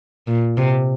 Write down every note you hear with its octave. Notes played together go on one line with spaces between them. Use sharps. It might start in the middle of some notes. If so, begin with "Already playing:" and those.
A#2
C3